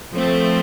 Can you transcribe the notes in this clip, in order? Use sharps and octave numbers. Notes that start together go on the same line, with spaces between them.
F3 A3 C4